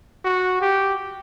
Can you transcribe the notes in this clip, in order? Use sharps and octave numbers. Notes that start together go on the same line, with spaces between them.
F#4
G4